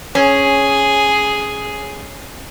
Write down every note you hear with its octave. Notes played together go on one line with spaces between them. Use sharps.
C#4 G#4